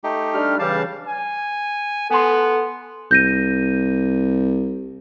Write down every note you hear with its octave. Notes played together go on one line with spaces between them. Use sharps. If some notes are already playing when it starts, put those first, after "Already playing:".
A3 D#4 G4
G3 D4 F6
C#3 E3 G3 F5 A5
G#5
B3 A4 G#5 C6
C2 G6 A#6 D#7